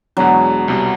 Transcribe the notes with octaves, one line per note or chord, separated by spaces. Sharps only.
E2 B2 F#3 G#3 B3 D4
C2 B2 G3